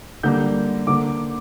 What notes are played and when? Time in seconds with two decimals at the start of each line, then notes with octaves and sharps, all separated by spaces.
0.23 D3 G3 A#3 G6
0.87 D3 A#3 D6